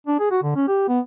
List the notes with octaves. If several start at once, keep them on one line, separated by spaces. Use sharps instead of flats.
D4
G#4
F#4
D3
C#4
G4
B3